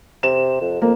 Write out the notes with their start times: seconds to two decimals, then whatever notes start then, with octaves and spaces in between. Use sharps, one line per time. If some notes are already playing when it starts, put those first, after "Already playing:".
0.23 C3 E7
0.61 F2
0.82 F2 A#3